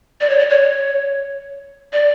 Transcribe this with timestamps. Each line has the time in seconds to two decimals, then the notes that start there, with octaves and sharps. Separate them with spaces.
0.21 D5
0.29 C#5
0.38 D5
0.50 C#5
1.93 D5